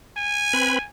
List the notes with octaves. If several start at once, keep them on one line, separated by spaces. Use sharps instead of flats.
G#5
C4 B4 B5